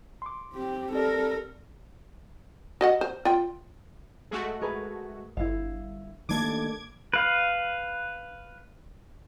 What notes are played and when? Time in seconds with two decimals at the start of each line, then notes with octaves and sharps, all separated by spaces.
0.22 C6 D6
0.53 C4 G4
0.92 C4 G4 A4 A#4 D5
2.81 F#4 D#5 F#5
3.01 C5
3.25 F4 G5
4.31 G#3 A3 F#4
4.61 G#4 A#4 B4
5.37 G1 E4 F5
6.29 D#3 A3 A#3 D4 A4 D6 G#6
7.14 B4 F5